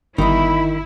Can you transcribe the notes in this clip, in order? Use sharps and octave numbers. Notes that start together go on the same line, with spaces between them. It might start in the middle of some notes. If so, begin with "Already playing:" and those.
G1 D#3 D#4 E4 B5